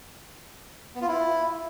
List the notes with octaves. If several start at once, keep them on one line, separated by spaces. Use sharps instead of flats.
B3
F4
E4